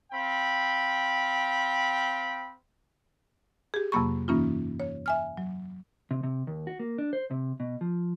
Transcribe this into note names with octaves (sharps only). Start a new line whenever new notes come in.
C4 F5 G5 B5
G4 G#4
F2 C3 F#3 A#3 B5 C#6
G2 E3 A#3 C#4 D#4 F4
C#5
E5 G#5 F6
F#3
C3
C3
D#2
F#4
A#3
D4
C5
C3
B2
F3